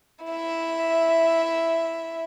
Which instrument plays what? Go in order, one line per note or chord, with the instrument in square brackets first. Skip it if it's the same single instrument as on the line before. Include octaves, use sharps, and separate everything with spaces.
[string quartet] E4 E5